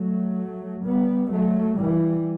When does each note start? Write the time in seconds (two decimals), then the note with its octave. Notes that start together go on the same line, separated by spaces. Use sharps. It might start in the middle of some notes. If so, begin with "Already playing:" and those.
Already playing: F#3 A3
0.84 G3 B3
1.31 F#3 A3
1.77 E3 G3